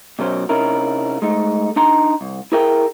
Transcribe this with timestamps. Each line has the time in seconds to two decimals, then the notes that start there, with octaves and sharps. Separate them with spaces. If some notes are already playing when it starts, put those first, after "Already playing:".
0.19 B2 F#3 C#4 C5
0.49 C3 C#4 D#4 E4 A#4
1.22 G#3 A3 D#4
1.76 D4 D#4 A#5 C6
2.21 C2
2.52 E4 G#4 A#4 E5 G5